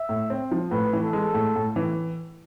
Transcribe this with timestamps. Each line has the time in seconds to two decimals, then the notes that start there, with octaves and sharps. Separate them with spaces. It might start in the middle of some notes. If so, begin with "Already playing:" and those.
Already playing: E5
0.09 A2
0.30 C4
0.51 F3
0.71 A2 B4
0.93 E3
1.03 A4
1.13 G#3
1.34 A2
1.56 A2
1.76 E3